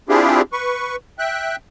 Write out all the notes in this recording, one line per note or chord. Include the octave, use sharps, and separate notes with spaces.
C4 D4 E4 F4 G4 G#4
B4 C#6
E5 G5 F#6